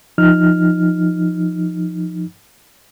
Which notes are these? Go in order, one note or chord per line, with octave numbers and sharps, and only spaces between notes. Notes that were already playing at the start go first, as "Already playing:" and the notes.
F3 D#4 F6